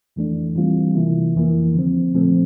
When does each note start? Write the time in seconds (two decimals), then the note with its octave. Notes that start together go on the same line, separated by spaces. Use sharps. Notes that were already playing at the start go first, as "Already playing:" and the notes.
0.16 F2 E3 A3 D4
0.55 E3 G3 C4 F4
0.95 C3 E3 A#3 E4
1.35 F2 E3 A#3
1.75 D3 F3 C4
2.14 A#2 F3 A3 C4